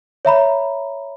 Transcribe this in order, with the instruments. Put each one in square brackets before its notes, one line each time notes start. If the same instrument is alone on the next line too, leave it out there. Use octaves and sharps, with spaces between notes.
[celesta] C#5 E5 A#5 B5